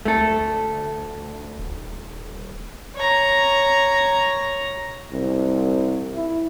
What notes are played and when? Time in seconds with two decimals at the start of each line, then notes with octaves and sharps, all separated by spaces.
0.05 D2 A3 A4
1.59 D#1
2.95 C#5 A#5
5.13 C2
6.14 E4